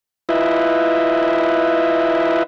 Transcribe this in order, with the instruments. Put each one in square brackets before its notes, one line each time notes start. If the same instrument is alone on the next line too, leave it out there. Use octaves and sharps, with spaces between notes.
[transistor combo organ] E4 F4 B4 D#5 E5